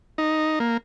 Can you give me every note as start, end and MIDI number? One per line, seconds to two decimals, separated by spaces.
0.18 0.59 63
0.60 0.77 58